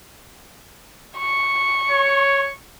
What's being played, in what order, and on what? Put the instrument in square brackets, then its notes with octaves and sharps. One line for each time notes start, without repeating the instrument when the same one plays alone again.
[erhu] C#6
[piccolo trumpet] C#5